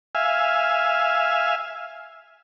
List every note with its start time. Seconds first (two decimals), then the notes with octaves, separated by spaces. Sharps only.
0.15 E5 F5 G#5